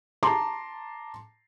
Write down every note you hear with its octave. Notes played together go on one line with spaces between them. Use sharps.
A5 A#5 C6 D6